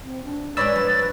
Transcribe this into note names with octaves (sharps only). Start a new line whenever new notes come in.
C4
D4
G#3 D4 B4 C#5 D5 B5 E6 A6
F3